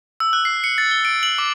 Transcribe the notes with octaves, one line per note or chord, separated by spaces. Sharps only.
E6
F#6
C7
C#7
A6
G7
D7
F#7
D6